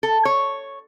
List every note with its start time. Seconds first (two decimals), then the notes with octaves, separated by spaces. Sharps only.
0.03 A4
0.25 C#5